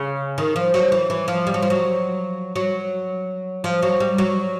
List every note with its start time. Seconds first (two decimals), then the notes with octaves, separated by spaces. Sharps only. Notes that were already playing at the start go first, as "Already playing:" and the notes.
Already playing: C#3
0.38 D#3
0.56 F3
0.74 F#3
0.92 E3
1.10 E3
1.28 F3
1.47 G3
1.54 F#3
1.62 F3
1.70 F#3
2.56 F#3
3.64 F3
3.82 F#3
4.00 G3
4.18 F#3